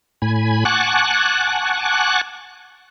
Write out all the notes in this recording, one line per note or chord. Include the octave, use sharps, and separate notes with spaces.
A2 G#5 B5
F#5 G#5 A5 C#6 D6 F#6